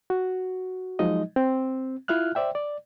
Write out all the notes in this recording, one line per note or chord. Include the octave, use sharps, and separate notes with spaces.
F#4
F3 F#3 G#3 D#4 D#5
C4
E4 F4 E5 F6 F#6
C5 D5 E5 G5
D5